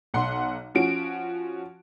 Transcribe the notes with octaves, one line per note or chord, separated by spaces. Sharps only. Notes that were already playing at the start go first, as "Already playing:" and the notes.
B1 F#5 C6
F3 C#4 F#4 D7